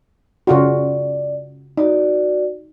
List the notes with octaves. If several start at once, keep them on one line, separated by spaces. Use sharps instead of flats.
C#3 F4 F#4 D5
D#4 F#4 D5